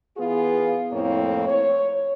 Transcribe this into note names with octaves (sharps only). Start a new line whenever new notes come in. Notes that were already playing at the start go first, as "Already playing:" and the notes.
E3 B3 F4 G#4
F2 A2 A#3 C4 E4 C#5
C#5